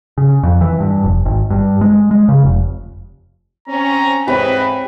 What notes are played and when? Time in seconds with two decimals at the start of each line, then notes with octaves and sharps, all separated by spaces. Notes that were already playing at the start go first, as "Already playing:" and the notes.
0.18 C#3
0.43 F2
0.61 E3
0.80 G2
1.04 F1
1.25 G#1
1.50 G2
1.81 G#3
2.11 G#3
2.29 C#3
2.43 F1
3.68 C4 C#4 A#5
4.28 G#2 E3 C4 G4 B4 C#5 D#5 B5